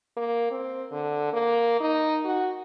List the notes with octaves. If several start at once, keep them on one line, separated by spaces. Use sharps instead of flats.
A#3
C4
D3
A#3
D#4
F#4